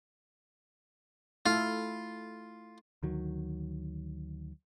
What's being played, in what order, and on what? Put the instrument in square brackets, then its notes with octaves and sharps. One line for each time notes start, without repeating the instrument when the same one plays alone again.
[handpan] A3 E4 A4 [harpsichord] F4
[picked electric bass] D2 D#3 F#3